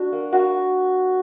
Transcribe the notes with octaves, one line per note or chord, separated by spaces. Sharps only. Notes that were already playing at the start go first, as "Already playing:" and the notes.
Already playing: D4 F#4
A#3
A#3 F#4